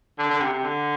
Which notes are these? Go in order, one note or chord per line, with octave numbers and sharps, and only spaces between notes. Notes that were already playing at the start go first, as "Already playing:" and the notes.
D3
D3
C3
C3
D3